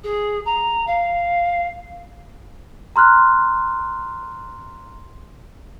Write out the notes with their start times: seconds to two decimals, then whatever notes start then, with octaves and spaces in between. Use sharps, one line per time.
0.04 G#4
0.45 A#5
0.87 F5
2.96 A#5 C6 F6 F#6